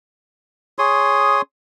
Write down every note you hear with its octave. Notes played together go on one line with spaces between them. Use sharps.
G#4 C#5 C6 D#6